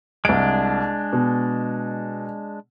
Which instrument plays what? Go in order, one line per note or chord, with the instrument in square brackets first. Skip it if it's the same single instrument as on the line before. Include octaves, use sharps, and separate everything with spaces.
[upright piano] C2 D7 [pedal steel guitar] G#3 D4
[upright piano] B2